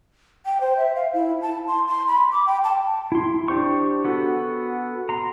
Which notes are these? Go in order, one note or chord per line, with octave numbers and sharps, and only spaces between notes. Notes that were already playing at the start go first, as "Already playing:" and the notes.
G5
C5
E5
F5
E4
A5
C6
C6
B5
D6
G5
A5
E4 C6
D4 G4 C5 C#6
B3 F#4 A4
A#5 C6